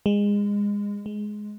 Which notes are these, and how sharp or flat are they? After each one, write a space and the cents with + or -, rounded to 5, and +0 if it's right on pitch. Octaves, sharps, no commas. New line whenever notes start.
G#3 -25
G#3 +10